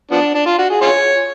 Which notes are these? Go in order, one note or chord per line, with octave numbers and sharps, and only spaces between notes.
F3 B3 D4
D4
F4
F#4
G#4
F4 G#4 C#5